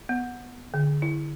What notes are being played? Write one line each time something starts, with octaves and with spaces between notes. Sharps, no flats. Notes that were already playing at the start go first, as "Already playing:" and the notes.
B3
D3
E4